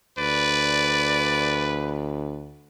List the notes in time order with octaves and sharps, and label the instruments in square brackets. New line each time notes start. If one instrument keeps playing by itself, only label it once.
[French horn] D2 [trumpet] B4 [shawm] D5